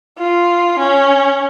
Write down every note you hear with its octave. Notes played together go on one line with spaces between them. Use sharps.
F4
C#4